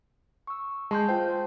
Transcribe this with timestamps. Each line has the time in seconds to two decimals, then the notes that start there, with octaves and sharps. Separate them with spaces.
0.47 C#6 E6
0.91 G#3 A5 C6 G6
1.08 F4 C5 G5